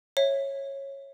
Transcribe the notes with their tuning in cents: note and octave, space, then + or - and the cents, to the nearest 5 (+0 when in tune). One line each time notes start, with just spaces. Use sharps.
C#5 -15 E5 +5